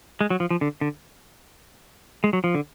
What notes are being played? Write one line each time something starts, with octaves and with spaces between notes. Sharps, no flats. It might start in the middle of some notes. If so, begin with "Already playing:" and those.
G#3
F#3
F3
F3
D3
D3
G#3
F#3
F3
D3